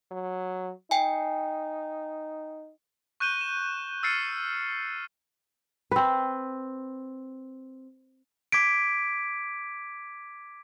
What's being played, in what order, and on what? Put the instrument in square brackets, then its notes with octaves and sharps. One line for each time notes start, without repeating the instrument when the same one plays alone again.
[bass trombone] F#3
[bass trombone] D#4 [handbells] G5 G#5
[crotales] C#6 F#6 G6 D#7 E7 G7
E7
E6 F6 A6 C7 C#7 D#7
[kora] C4 B4
[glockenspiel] D6 G#6 B6 D7